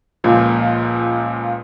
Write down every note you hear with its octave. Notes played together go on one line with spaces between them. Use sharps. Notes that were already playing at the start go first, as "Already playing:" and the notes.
C#2 A#2 F3